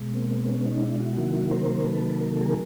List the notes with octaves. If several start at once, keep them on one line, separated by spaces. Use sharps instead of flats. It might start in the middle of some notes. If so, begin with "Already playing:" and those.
Already playing: B2 G#3
A#3 C4
B3 C#4
C#4 D#4
D4 E4
E4 F#4
C3 D#3 F#3 A#3 E4 F#4
A#4 C5
A4 B4
A#4
A4
G#4 A#4